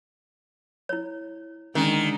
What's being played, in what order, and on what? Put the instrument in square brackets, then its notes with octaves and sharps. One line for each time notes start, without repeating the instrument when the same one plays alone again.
[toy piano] E4 C#5
[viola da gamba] D3 G#3 [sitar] D#3 [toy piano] C#4